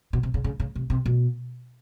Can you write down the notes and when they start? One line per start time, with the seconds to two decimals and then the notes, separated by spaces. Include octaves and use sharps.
0.13 B2
0.23 C3
0.34 C#3
0.44 C#3
0.60 C#3
0.76 C3
0.90 C3
1.06 B2